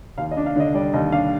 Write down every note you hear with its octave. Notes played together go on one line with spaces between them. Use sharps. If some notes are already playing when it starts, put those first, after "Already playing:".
D#2 F5
D#5
D4
F5
D3 D5 D#5
G3 D5
D#2 D#5
D4 F5